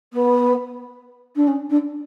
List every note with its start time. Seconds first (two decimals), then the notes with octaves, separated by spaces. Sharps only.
0.13 B3
1.36 D4
1.47 C#4
1.69 D4